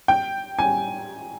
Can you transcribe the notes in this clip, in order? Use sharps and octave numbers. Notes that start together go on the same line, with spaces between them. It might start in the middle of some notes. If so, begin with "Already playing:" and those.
G5
G#5